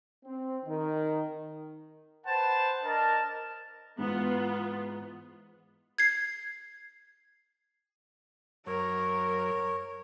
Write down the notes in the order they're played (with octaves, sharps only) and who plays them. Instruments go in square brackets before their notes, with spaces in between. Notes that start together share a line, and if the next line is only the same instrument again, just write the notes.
[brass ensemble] C4
D#3
[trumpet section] B4 C5 F#5 G5 A5
D4 A#4 D#5 A5
[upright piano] G#2 E3 [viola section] B3 F4
[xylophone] G#6 C7
[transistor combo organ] F#2 [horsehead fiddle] A#4 [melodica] C#5